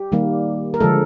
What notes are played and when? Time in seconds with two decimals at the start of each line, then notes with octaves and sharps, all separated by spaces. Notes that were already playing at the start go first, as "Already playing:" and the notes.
Already playing: G4
0.12 D#3 G3 A#3
0.74 A#4
0.80 D3 F3 G#3 A4